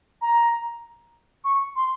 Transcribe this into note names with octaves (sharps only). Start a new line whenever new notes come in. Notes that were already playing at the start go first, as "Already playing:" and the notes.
A#5
C#6
C6